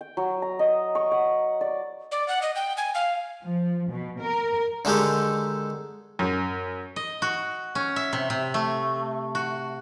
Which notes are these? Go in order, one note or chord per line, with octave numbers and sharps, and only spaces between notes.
G5
F#3
A#5
D#5
C#6
F#5
D5
D5
F#5
D#5
G5
G#5
F5
F3
B2
A#4
D3 D#3 G#3 G4 A4
F#2
D#5
F#4
C#4
E5
C3
C3
A3
F#4